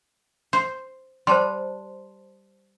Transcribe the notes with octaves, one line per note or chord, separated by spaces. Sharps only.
C5
G3 C5 A5 C6